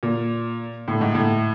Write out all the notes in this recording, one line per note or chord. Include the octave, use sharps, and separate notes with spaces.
A#2
A2
G#2
A2